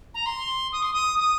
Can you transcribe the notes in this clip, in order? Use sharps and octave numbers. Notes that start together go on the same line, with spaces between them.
A#5
C6
D#6
C6
D#6
D#6